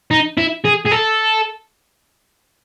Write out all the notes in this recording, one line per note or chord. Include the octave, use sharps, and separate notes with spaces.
D#4
E4
G#4
G#4
A4